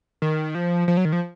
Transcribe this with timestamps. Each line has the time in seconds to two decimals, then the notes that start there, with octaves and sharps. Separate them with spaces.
0.22 D#3
0.55 F3
0.88 F3
0.97 F#3
1.05 D#3
1.13 F3